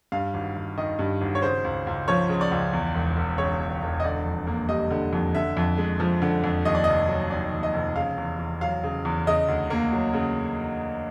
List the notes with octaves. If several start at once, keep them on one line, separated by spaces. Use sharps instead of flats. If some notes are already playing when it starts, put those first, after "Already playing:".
G2 F5
G#1
G#1
D#3 D#5
G2
G#1
C#5
C#3 C5
C#2
C#2
F3 C#5
C#3
D5
C#2
E2
E1
E1
C#3 C#5
E2
E1
D#5
D3 D5
F2
A#3
G3 D#5
D3
F2
D3 E5
F2
G#3
F3
D3
F2
D#2 D#5
D5
F1 D#5
F#3
D#3 D5
D#2
D#5
F1
C#3 F5
E2
E2
F#3 F5
C#3
E2
C#3 D#5
D2
A#3
F#3
C#3